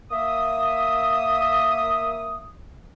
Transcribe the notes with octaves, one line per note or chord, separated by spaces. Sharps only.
A#3 E5 D#6